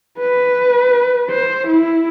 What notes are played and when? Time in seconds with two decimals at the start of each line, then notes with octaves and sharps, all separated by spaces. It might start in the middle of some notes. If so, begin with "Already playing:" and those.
0.19 B4
1.30 C5
1.68 E4